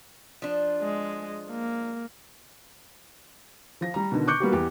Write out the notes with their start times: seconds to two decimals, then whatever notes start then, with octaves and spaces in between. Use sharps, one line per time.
0.42 F3 D4
0.82 G#3
1.51 A#3
3.81 F3 A#6
3.94 G3 A#5
4.12 B2 D3 D#3
4.27 C#6 D6 F#6 G6 C#7
4.40 G3 A#3 B3 F#4 G4
4.53 E2 G4